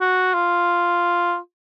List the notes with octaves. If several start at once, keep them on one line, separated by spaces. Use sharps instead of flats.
F#4
F4